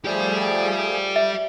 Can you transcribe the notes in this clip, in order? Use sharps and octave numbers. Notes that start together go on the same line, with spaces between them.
F3 A3 G4 G#4 D5
E5